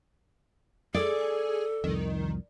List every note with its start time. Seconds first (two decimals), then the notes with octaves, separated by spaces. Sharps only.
0.95 G#4 A4 D5
1.84 C2 F2 D#3